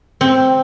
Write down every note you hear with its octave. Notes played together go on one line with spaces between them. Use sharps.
C4